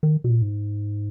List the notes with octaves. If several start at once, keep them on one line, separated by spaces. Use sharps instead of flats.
D#3
B2
A#2
G#2